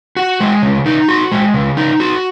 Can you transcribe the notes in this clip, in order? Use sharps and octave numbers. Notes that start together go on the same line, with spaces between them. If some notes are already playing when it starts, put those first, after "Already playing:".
F#4
G#3
C#3
D#4
F#4
G#3
C#3
D#4
F#4